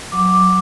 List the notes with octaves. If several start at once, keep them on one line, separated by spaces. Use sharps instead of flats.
F#3 D6